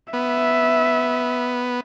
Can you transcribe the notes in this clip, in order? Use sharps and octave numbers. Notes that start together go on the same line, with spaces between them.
B3 E5